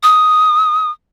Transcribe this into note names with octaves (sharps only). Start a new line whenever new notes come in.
D#6